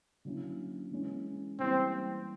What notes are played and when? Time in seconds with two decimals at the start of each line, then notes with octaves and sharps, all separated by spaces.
0.25 D3 F#3 A#3 C#4 E4
0.91 E3 G#3 C#4
1.59 E3 G3 A#3 C4